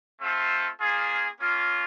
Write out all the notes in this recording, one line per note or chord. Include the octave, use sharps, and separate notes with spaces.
A3 C4 F4 A4
A#3 C#4 F4 G#4
A#3 C#4 F4